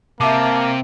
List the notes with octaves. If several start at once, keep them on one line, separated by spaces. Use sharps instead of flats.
C3 A#3 E5 A5 D6